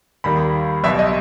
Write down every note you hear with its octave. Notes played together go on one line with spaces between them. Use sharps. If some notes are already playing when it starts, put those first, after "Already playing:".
D#2 D#3 G3 B5
B1 B2 G3 E5
D#5